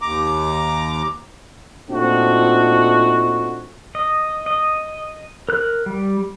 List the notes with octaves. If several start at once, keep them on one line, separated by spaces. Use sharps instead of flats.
D#2 A#5 D6
A#2 A3 C4 D4 D#4 F#4
D#5
D#5
A#4 F#6
G3